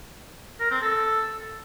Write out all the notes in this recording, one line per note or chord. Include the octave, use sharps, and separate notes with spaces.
A#4
C4
A4